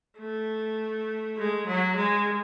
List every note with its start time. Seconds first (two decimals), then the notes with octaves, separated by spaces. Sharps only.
0.19 A3
1.38 G#3
1.67 F#3
1.96 G#3